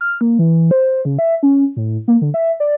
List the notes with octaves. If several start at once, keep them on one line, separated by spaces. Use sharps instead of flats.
F6
A#3
E3
C5
C#3
E5
C#4
A2
A#3
D3
E5
D5